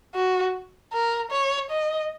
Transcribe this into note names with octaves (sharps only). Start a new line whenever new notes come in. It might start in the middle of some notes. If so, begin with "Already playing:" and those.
F#4
A#4
C#5
D#5